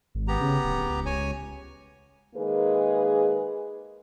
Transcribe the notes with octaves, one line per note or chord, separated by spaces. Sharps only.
G#1
B3 G4 A#5
C#3
D1
C#2
C#2 C#5 G#5
D#3 G#3 A#3 G#4 A#4 B4